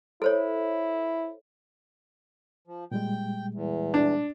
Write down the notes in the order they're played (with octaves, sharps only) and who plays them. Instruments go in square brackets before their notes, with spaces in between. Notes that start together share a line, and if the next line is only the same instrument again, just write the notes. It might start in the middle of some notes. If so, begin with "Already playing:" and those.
[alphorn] E4 [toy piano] A4 C5 C#5
[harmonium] F3
[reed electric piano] A#2 G3 G#3 [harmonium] G5
[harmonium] E2
[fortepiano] D4